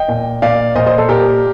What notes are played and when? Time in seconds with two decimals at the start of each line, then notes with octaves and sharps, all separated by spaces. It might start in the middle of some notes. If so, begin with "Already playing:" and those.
Already playing: D#5 G5
0.09 A#2
0.42 A#2 D5 F5
0.75 A#2 C5 D#5
0.86 C5 D#5
0.98 A4 C5
1.09 A#2 G4 A#4